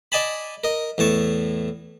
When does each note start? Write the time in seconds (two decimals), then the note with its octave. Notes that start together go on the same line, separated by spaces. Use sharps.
0.12 D5 D#5 G#5 A5 B5
0.64 A#4 D#5
0.98 E2 A2 A5 C#6